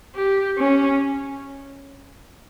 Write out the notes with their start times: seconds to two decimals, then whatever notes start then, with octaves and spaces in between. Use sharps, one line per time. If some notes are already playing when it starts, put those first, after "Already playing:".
0.15 G4
0.58 C#4